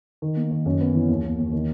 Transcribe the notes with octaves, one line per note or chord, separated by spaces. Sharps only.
D#3
A#3
D#3
F#2
B3
E3
D#2
D#2
D#2
D#3